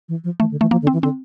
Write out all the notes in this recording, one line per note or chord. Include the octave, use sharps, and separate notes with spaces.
E3
F3
E3 A3
D3
E3 A3
F3 A#3
D3
C4
E3
D3 C4